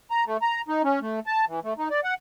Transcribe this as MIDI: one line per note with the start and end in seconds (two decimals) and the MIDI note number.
0.11 0.24 82
0.26 0.37 57
0.42 0.62 82
0.68 0.82 63
0.84 0.99 61
1.01 1.20 57
1.27 1.45 81
1.47 1.60 52
1.64 1.74 57
1.78 1.88 63
1.90 2.00 74
2.04 2.14 78